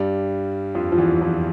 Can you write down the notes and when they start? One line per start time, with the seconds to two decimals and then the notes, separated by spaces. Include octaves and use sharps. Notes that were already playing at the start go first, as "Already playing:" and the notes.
Already playing: G2 G3
0.75 F2 F3
0.92 F3
0.98 E2 E3
1.21 F2 F3